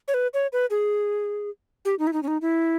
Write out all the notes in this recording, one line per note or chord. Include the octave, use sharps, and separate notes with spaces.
C#5
B4
C#5
B4
G#4
G4
D#4
E4
D#4
C#4
D#4
E4